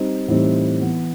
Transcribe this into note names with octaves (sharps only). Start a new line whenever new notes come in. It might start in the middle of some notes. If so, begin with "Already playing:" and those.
Already playing: G3 C4 D#4
A2 E3 G3 C4 D#4
E3 B3 E4